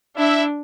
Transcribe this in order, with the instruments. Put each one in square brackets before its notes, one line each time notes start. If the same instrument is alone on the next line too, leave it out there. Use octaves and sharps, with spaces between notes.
[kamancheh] D4 [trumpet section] E4 E5